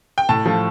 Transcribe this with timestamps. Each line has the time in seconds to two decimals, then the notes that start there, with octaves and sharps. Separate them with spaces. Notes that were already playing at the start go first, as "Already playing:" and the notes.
0.18 G5
0.29 A2 A5
0.46 F3 A3